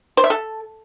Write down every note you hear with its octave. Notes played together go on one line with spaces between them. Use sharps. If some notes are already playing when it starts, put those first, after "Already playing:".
C5
E5
A4